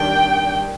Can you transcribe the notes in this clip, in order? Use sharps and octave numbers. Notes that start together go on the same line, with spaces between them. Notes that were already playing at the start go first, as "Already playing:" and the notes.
Already playing: D#3 G3 D4 G5